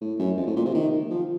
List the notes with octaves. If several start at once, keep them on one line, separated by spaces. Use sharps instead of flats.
A2
F#2
F2
A2
A#2
C3
D#3
F3